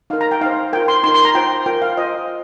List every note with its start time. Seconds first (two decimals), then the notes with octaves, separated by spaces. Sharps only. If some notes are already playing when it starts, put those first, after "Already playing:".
0.10 D#4 A#4 F5
0.21 A#5
0.31 G5
0.41 D#4 C5 F5
0.73 F4 A#4 G5
0.88 C6
1.03 D#4 C6
1.08 A#4
1.14 C6
1.25 A#5
1.35 F4 C5 G5
1.66 F4 A#4 G5
1.82 F5
1.97 F4 C5 D#5